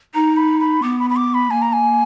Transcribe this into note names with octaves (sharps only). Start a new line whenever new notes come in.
D#4 A#5
B5
B5
B3 D6
B5
B5
D6
B5
A#3 G#5
A#5
G#5